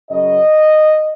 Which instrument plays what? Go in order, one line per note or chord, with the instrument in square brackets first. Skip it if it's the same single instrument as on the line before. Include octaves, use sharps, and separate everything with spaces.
[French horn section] F#2 C#3 F#3 D#5